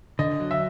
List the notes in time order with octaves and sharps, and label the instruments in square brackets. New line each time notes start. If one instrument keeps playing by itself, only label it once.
[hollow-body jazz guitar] D3 [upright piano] D#5
[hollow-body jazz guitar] F#3
[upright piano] E5